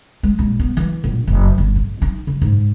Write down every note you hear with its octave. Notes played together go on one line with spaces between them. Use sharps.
G#3
A#1
B3
E3
A#1
F#1
G1
A2
D#4
C#3
G#2